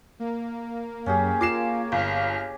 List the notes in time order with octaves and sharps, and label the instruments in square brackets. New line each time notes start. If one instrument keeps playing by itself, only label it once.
[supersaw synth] A#3
[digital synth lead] F#2 [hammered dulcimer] C#4 G4 G#4
[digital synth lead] F4 [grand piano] D6 C7 E7
[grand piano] G1 [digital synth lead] F6